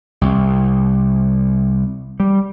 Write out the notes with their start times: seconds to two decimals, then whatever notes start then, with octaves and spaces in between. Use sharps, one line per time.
0.21 C2
2.20 G3